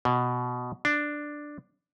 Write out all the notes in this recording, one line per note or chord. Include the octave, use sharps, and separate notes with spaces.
B2
D4